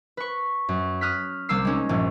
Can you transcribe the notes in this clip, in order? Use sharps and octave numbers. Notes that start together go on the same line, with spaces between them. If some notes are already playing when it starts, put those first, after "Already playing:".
B4 C#6
F#2
D#6 F6 F#6 B6
C2 G3 A#3 D6 E6 C7
G#3 C#4 D#4
A#1 G2